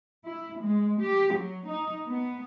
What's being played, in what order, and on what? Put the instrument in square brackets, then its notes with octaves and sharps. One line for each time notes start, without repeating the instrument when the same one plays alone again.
[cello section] E4
G#3
G4
F#3
D#4
B3